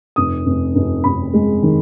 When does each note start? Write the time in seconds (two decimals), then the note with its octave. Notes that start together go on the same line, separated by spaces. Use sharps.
0.16 F1 D#6
0.46 F1
0.75 F1
1.04 F1 B5
1.34 G#3
1.63 D#3